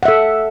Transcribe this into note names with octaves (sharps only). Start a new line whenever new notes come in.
A4 E5 F#5